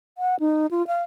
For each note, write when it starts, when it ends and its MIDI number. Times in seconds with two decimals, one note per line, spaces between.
0.18 0.39 78
0.40 0.67 63
0.71 0.86 65
0.87 1.03 77